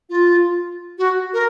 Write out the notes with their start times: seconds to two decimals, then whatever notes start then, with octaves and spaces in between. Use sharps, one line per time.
0.10 F4
0.98 F#4
1.34 A#4